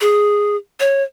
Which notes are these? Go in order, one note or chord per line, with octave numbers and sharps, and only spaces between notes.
G#4
C#5